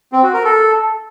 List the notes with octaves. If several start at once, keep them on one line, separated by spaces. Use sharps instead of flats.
C4
F#4
A#4
A4